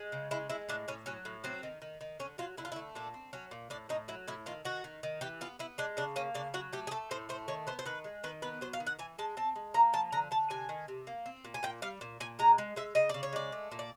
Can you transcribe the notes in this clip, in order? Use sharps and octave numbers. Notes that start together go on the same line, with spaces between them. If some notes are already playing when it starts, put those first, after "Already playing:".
Already playing: G#3
C#3
G#3 E4
G#3 E4
A2 D4
A2 C#4
F#3 C#4
A2
F#3 C4
D#3
D#3
D#3
D3 C#4
F#3 F4
D3 E4
F4
E4
A3
A#2 D4
C4
F#3 C#4
A#2
A2 D4
A2 D#4
F#3 E4
A2 E4
D#3 F4
D#3 F#4
D#3
D#3
E3 G4
B3 F4
B3 E4
G#3 D4
C#3 D4
A#3 C#4
C#3 D4
F#3 F#4
A3 G4
G#4
A3 A4
A2 C5
A3 C5
D#3 C#5
B3 C5
C5
D#3 B4
G#3
D#3 B4
B3 B4
F#3 C5
F5
D#3
F#5
E3 G#5
G#3 A5
C4 A5
G#3
A#3 A#5
F3 A5
D3 A#5
D3 A5
C3 G#5
D#3
C3
A#3
C4
A#2
G#5
A#2 G5
G3 F5
A#2
A#2 G#5
G#3 A#5
G#3
G#3 E5
C#3 D#5
C#3 D5
C#5
G#3 D5
A3
A#2
D5